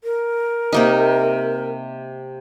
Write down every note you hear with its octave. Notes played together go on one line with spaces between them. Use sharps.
A#4
C3 A#3 D#4